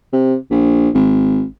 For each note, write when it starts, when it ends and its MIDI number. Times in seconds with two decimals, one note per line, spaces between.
0.12 0.36 48
0.51 0.89 34
0.94 1.43 32